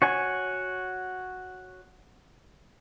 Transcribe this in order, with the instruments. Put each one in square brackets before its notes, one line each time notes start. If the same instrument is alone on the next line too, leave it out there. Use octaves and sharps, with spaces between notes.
[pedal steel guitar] F#4 C#5 G#5